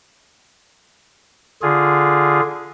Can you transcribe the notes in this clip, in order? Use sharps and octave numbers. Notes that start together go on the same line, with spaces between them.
D3 F4 G#4